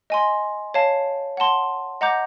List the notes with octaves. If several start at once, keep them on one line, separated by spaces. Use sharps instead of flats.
D#5 G#5 C6
C#5 F5 A5
F#5 A5 C6
D#5 F#5 A#5 D6 G6